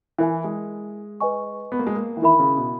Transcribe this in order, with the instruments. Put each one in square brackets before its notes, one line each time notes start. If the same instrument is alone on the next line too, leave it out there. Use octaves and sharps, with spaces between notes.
[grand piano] E3 [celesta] E4 A#4 E5 G#5
[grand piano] G#3
[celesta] B4 D#5 G#5 C#6
[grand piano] B3
A#3
G#3
A#3
E3
[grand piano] D#3 [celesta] E4 A#4 E5 B5
[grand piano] C#3
B2